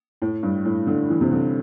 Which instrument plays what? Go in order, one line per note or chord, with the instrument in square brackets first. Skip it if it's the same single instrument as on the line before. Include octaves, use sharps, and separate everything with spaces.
[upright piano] A2
G2
A2
D3
E3
C3
D3